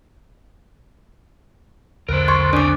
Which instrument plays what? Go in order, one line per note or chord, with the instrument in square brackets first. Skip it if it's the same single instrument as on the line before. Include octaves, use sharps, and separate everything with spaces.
[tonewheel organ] B1 E2 D3 [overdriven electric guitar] A#4 C5
[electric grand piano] C6 C#6 [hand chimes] G#6
[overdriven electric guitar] C4 D5 [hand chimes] D4 D6